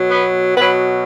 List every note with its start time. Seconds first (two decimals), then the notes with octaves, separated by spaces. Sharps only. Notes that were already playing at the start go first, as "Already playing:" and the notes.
Already playing: B2 F#3
0.08 B3 B4
0.55 B2 F#3 B3 B4